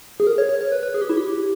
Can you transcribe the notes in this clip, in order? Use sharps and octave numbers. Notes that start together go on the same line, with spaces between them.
G#4
A#4
C#5
C#5
C#5
B4
B4
G#4
G4
E4
G4